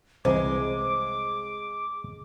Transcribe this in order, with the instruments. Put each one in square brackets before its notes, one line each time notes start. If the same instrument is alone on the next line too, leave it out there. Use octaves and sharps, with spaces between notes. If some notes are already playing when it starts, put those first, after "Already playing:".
[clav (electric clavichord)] C2 E3 A#5 [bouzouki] G#3 [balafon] C5 [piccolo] D6